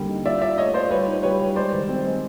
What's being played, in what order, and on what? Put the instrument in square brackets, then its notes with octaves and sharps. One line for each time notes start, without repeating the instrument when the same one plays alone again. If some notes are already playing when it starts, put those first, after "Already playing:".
Already playing: [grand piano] D3 G3 A#3 C4
D#4
[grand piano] F4 [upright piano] D5 E5
[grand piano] F4 [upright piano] D5 E5
[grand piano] A3 [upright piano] C#5 D#5
[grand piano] F4 [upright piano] C5 D5
[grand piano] G3 [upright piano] B4 C#5
[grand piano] D#4
[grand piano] G3 [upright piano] B4 C#5
[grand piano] G3
[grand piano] G#3 [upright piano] C5 D5
[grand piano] D#3
C4
G#3